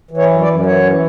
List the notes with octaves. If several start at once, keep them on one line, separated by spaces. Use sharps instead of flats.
E3
C#5
F#2
D5
F#2
E3 C#5
E3